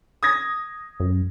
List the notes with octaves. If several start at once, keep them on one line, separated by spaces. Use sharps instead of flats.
D#6 G#6 A#6
F#2